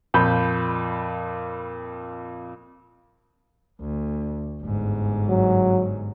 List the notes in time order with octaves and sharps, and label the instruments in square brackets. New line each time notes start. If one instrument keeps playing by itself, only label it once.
[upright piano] F2 A#2 B5 G6
[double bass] D2
G1 G#2
[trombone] F#3